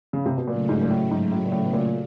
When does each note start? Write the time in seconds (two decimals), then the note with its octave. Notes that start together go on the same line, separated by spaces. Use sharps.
0.13 C#3
0.26 C3
0.37 B2
0.48 A#2 C#3 F#3 A3
0.69 G#2
0.81 A#2
0.90 A2
1.11 G#2
1.32 A2
1.45 A#2
1.52 A2
1.64 B2
1.73 A#2